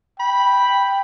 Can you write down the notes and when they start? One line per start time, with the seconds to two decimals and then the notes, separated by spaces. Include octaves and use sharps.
0.20 G5 B5